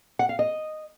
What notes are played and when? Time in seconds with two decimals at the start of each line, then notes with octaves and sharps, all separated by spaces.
0.19 F#5
0.29 F5
0.39 D#5